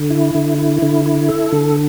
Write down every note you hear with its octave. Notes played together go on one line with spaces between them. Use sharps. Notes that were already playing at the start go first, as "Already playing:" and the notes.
Already playing: D3
E4
D3
E4
D3
E4
A4
D3